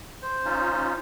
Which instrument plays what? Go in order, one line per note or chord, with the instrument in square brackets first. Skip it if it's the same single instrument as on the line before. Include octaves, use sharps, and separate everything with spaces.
[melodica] C5
[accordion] C#4 D#4 F4